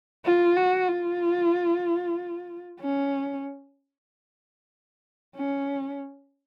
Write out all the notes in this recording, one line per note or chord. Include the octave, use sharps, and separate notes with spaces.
F4
F#4
F4
C#4
C#4